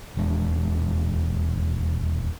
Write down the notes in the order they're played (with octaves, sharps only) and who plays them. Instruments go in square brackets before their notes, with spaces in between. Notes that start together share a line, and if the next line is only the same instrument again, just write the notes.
[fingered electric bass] D#1 E2 G#3 D4